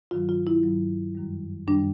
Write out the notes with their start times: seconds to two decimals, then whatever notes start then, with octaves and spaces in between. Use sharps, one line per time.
0.11 G2 D#3 F#3 F4
0.29 F4
0.47 E4
0.64 G2 D#3 F#3
1.15 F#2 D#3 G3
1.68 F#2 D#3 G3 D4